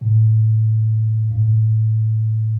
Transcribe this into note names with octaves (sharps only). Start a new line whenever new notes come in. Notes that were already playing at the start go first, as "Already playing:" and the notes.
A2 C3
G2
A2